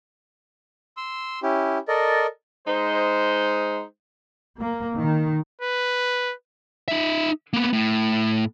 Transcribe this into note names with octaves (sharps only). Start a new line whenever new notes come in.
C6 E6
C#4 E4 G4
A4 A#4 D5 D#5
G#3 D#4 C5
A#3
D#3
B4
D#4 E5
A#3 B3
A2